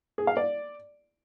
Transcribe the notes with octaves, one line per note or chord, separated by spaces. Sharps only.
G#4
F5
D5